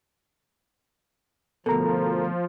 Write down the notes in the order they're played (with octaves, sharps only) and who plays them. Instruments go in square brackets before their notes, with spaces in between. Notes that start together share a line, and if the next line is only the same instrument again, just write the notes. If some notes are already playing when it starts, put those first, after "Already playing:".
[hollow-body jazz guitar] D2 B2 [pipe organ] F3 [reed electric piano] A4 A#4 A#5